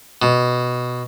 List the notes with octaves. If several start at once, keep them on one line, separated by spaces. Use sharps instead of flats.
B2